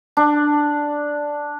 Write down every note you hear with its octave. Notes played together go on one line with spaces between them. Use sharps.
D4